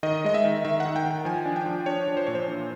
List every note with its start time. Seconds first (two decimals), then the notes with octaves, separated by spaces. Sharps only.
0.03 D#3 D#5
0.24 G#3 D#5
0.34 E5
0.45 D#3
0.65 D#3 E5
0.80 F#5
0.85 D#3
0.96 G5
1.06 D#3 G5
1.25 F3 G#5
1.45 D4
1.56 G5
1.66 F3
1.86 D4 C#5
2.08 F3
2.17 C5
2.27 A#2 C#5
2.35 C5
2.48 E3